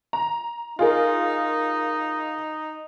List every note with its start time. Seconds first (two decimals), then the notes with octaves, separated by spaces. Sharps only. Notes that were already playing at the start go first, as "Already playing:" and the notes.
0.13 A#5
0.79 D#4 F4 G#4 A#4